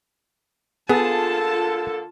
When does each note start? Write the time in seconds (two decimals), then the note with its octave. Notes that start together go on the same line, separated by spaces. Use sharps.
0.89 D3 A#3 B3 F4 G#4 A4 A5